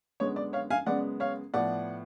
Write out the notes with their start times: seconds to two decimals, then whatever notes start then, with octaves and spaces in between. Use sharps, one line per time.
0.20 F#2 D3 G#3 B3 C#5
0.36 D5
0.53 C#5 F5
0.70 F5 G#5
0.86 F#2 C#3 G#3 B3 D5 F#5
1.20 C#5 F5
1.54 A2 F3 B3 D5 F#5